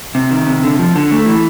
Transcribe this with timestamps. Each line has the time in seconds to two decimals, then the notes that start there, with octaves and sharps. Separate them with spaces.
0.15 C3
0.31 D#3
0.47 C3
0.64 D3
0.79 F3
0.96 D3
1.11 A3
1.26 E3